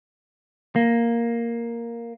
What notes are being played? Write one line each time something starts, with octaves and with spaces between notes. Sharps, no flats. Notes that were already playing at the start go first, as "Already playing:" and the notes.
A#3